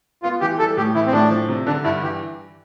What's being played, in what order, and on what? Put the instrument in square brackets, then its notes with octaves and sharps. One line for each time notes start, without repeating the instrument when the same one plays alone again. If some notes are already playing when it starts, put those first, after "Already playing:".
[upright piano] B3 [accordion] F4
[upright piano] E3 [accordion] G4
[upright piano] G3 [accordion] A4
[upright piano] A2 [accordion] G4
[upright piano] E3 [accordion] E4
[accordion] C4
[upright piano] A2 [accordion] D4
[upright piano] F3
C3
[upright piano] D3 [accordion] D4
[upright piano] G2 [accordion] E4
[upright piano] E3 [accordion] G4